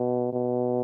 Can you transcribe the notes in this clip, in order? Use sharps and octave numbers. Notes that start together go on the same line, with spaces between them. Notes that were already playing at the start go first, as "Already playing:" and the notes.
Already playing: B2
B2